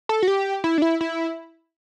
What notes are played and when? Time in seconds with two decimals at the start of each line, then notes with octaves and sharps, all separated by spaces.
0.09 A4
0.23 F#4
0.28 G4
0.64 E4
0.78 D4
0.82 E4
1.01 E4